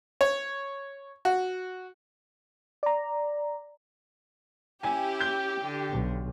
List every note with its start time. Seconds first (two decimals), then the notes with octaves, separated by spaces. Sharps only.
0.21 C#5
1.25 F#4
2.83 D5 A#5
4.83 C#4 E4 G4 G#5
5.21 G6
5.61 D3
5.90 B1